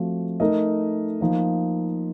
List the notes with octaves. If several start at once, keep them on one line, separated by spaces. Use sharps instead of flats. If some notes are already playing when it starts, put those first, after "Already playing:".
Already playing: F3 A3 C4 F#4
A3 D#4 A#4 D#5
F3 A#3 D#4